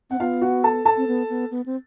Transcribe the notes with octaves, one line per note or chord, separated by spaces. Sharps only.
C4 F#5
B3 F4 F5
F#4 F#5
A4 A5
A4 A5
C4
B3
B3
B3
C4